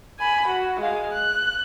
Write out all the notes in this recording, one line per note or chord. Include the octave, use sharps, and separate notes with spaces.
G#5 B5
F#4
G#3 F5
F#6